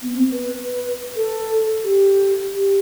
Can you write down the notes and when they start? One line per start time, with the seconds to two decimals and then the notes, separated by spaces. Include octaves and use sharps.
0.02 B3
0.13 C4
0.31 B4
1.16 A4
1.84 G4
2.53 G4